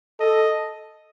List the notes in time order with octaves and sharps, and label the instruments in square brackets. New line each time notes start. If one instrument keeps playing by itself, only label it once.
[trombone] A4 [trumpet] D#5